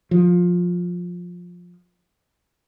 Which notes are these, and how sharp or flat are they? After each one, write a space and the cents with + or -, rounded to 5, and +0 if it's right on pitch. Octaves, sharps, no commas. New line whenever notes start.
F3 +15